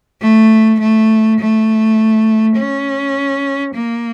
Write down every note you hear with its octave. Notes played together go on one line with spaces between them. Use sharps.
A3
A3
A3
C#4
A#3